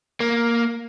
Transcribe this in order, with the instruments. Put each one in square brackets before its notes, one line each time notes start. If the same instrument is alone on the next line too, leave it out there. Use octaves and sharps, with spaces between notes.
[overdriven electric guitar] A#3